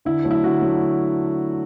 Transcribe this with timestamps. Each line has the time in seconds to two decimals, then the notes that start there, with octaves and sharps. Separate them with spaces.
0.05 D3 E4
0.24 F#3 A3
0.31 E4
0.44 D3 F#4
0.62 F#3 A3